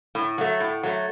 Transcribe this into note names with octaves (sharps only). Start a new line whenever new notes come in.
A2
F#3 A3
A2
F#3 A3